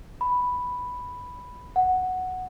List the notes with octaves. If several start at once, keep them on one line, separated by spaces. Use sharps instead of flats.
B5
F#5